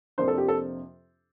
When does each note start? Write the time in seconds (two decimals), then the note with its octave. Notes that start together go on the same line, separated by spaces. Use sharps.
0.18 F2 C3 F3 A#3 D4 C5
0.28 A4
0.38 G4
0.48 A4